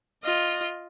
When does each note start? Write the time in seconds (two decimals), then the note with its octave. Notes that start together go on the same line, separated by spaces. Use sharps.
0.24 F4 D#5